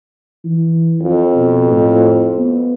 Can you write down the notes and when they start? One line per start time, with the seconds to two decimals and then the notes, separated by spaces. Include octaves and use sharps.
0.45 E3
1.03 F2
1.35 B2
1.70 A2
2.39 B3